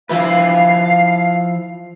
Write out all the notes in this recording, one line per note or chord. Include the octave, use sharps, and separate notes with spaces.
F3 E4 B4 F5